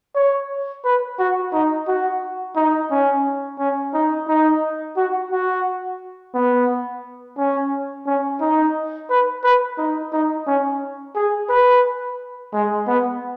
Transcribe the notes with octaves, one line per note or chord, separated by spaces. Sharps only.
C#5
B4
F#4
D#4
F#4
D#4
C#4
C#4
D#4
D#4
F#4
F#4
B3
C#4
C#4
D#4
B4
B4
D#4
D#4
C#4
G#4
B4
G#3
B3